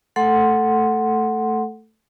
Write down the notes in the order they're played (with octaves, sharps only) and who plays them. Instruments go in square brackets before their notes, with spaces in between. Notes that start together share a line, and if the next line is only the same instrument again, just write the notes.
[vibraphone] A3 A4 F#5 C6